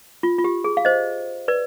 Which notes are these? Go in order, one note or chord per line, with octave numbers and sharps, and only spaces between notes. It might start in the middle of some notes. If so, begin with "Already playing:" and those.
F4
F4
G4
G#4
F5
C5 D#5
B4 D5